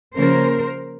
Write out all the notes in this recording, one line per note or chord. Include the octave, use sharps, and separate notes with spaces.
C#3 F3 A#3 C#4 A#4 C5